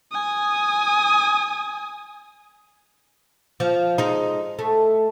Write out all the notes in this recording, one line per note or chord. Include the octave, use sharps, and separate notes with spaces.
G#5 D#6
F3
G#3 D#4
A3